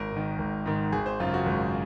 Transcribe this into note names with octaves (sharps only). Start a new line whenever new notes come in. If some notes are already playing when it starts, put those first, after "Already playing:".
Already playing: G#1 A#4
G#2 D#3
G#1
G#2 D#3
G#1 G#4
C5
F#2 C#3 F4
F#4
G#1